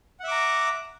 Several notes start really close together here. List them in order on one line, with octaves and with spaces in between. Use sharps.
F#5 E5 D6 A#5